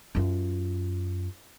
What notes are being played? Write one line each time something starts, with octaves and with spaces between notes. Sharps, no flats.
F#2 F4